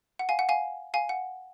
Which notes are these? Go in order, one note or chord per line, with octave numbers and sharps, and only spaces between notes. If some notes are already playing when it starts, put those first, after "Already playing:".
F#5
F5 G#5
F#5
F5 G#5
F5 G#5
F#5